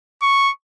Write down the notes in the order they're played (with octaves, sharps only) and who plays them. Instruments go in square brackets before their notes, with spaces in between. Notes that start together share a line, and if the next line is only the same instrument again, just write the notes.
[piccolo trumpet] C#6